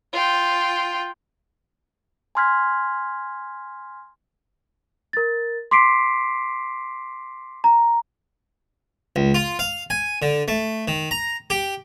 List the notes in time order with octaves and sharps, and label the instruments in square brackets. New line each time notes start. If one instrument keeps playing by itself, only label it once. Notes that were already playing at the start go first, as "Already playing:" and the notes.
[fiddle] F4 G5
[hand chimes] G#5 A#5 C6 F6 G#6 B6
[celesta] A#4 A6
C6 D6 B6 C7 D7
A#5
[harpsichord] C#2
F4
F5
G#5
D3
A3
D#3
A#5
G4